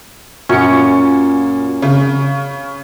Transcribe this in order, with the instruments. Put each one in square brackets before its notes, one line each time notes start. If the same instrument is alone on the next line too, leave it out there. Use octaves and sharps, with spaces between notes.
[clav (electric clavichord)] F#2 C#4 [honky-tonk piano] A#2 C#7
[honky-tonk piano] C#3